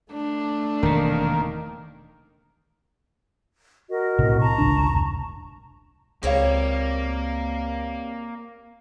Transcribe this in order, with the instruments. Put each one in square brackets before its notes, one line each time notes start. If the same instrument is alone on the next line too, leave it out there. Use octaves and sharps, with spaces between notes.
[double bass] A3 [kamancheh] D4
[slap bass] E1 C3 [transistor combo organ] D#3 A#3
[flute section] F#4 A#4 D#5
[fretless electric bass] B1 A2 C3
[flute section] A5 A#5 C#6
[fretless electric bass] G#1 C#2 D4
F1 C2
[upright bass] C#2 [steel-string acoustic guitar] G3 C4 C#5 [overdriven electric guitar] A#3 [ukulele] G#4 F5